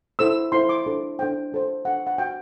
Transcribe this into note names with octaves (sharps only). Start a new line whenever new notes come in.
E4 A4 C5 E6
E4 A4 C5 C6
D6
D4 A4 C5
D4 A4 C5 G5
D4 A4 C5
D4 A4 C5 F#5
F#5
F#4 C5 G5